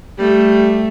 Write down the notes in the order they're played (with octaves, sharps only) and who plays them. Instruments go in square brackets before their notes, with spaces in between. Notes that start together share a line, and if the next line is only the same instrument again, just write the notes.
[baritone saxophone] G3 [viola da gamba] A3